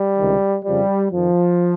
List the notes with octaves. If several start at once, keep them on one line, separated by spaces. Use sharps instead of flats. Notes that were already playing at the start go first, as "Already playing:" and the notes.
Already playing: G3
C#2 C3 D#3
F2 C#3 F3 G3
F2 D#3 F3